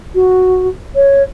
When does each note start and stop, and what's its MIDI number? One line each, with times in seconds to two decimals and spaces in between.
0.15 0.68 66
0.95 1.23 73